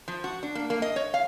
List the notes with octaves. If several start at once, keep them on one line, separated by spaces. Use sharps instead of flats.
F3
F#4
D4
A#3
A#3
D#5
C#5
F5